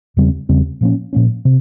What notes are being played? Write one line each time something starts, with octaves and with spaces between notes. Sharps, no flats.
E2 C#3 G3 C4
E2 C#3 G3 C4
A#2 F3 A#3 C#4
A#2 F3 A#3 C#4
C3